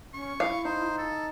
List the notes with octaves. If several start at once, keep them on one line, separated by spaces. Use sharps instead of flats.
C#4 C#6
E4 F5
D#4 C5
A4